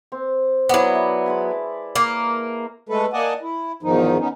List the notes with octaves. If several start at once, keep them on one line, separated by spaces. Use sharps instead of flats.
C4
F#3 B3 E4 D5 C#6
B4 E5
G#3 A5 B5
A#3
G#3 A3 A4 B4
A#3 D5 D#5 F#5 G#5 A5
E4
E2 G#2 D#3 F3 D#4
B3 C#4 D#4